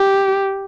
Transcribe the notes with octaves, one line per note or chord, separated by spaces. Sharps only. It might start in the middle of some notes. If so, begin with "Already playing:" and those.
Already playing: G4